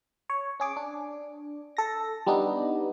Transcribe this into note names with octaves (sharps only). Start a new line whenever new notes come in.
C#5
C#4 G#4 D6
D4
A4 A#6
G3 B3 D4 D#4